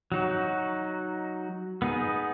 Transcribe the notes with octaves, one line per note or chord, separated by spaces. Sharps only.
F#3 D#4 F#4
B3 D#4 G#4